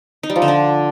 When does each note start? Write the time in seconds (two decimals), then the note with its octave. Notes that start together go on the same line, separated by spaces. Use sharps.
0.23 D#4
0.30 G3
0.36 F3
0.42 D3
0.48 D4